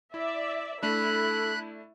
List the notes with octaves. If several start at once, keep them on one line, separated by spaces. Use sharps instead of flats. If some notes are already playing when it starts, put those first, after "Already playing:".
E4 D5 E5
A3 D4 E4 A4 B5 F#6